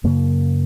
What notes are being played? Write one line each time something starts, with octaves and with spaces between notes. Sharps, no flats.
F#2 C#3 A#3